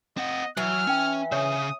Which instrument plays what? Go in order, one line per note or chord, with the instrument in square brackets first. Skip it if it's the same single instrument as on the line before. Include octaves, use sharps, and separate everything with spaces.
[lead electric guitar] C4 F#5 [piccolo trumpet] D#5
[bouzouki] E3 [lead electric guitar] F#3 [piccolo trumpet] F6
[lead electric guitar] C#4 [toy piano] D#4 G5
[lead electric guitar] C#3 [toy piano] C#5 E5 C#6 [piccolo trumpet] D#6